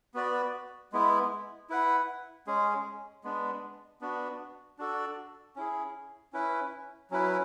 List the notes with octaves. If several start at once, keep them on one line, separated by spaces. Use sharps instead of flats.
B3 F#4 B4 D5
G#3 B3 E4
E4 B4 F#5
G#3 C#4 G#4
G#3 B3 D4
B3 D4 F#4
D4 F#4 A4 D5
C#4 E4 G#4
C#4 E4 B4
F#3 C#4 E4 B4